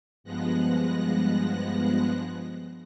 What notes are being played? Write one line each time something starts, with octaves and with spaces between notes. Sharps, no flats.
G2 F3 G#3 B3 F#6 A#6